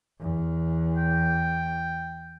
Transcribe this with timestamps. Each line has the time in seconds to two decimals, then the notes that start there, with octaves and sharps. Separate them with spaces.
0.20 E2
0.97 G5